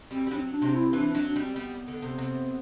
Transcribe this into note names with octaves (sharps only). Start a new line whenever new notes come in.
G3 C4
G3
F#3 C4 D4
D4
C3
E4
E3 D4
D4
F#3
D4
G3 C4
G3 B3
D3
C3
C3